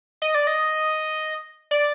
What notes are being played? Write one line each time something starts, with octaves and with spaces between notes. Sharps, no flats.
D#5
D5
D#5
D5